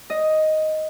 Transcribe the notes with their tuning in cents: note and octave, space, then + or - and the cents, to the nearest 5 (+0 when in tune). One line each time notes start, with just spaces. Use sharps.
D#5 +5